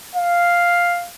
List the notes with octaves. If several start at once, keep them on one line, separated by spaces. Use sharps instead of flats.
F5